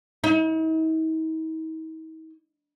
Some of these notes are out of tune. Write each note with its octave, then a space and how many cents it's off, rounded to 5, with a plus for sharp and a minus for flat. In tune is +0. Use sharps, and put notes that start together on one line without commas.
D#4 +45